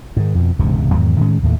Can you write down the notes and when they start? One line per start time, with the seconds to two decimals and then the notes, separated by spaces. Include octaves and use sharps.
0.17 G#2 D#3
0.35 F2 B2
0.59 E1 C#2 G#2 C3
0.94 E2 G#2 D#3 F#3
1.20 A2 D#3 G#3 C#4
1.43 D#2 A2 A3